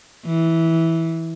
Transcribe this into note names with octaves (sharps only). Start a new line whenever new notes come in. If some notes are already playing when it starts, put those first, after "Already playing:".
E3